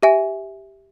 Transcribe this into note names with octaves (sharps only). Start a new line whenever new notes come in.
G4 E5 G#5